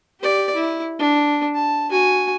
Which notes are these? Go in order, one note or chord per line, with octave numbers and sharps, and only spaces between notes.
G4 D5
E4
D4
A5
F#4 G#5